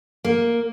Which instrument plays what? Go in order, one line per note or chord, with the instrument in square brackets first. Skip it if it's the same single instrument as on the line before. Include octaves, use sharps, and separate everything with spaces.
[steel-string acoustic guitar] A#3